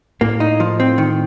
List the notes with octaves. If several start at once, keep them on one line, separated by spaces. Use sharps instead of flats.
A2 A#3
D#4
F3
C4
D#3